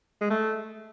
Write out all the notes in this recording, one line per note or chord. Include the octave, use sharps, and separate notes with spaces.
G#3
A3